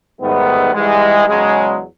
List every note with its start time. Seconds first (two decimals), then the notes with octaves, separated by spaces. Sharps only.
0.19 G#2 D#3 G3 A3 B3
0.73 G#2 E3 G3 G#3
1.27 E2 C#3 F#3 G#3